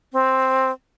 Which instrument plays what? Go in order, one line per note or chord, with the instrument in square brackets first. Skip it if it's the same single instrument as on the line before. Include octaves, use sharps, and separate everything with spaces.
[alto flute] C4